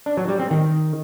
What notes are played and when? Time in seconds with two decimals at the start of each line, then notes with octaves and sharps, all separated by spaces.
0.06 D4
0.17 F#3
0.28 G3
0.39 C4
0.51 D#3